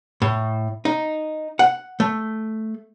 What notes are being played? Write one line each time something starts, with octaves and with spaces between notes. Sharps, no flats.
A2
D#4
F#5
A3